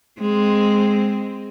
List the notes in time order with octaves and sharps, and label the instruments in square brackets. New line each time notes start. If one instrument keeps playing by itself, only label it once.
[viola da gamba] G#3 C4